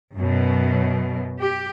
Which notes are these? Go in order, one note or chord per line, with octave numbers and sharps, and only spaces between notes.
F#2 B2
G4